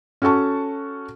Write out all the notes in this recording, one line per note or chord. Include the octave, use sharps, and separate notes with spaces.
C#4 F#4 A4 A5 C#6